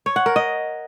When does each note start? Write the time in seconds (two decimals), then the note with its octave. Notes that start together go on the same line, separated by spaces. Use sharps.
0.06 C#5
0.16 F#5
0.26 A#4
0.36 D#5